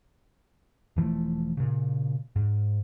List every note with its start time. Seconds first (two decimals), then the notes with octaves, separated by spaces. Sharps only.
0.96 E1 E3 F3 A3
1.57 A#2 C#3
2.36 G#2